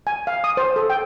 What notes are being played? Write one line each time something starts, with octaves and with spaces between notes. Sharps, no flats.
G#5
F5
D#6
C5
A4
G5